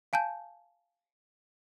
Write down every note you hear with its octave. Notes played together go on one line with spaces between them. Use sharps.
F5 G#5 A5 G6